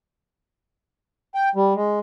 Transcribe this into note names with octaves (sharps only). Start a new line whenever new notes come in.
G5
G3
G#3